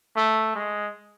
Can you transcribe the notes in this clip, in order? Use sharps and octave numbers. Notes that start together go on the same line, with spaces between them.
A3
G#3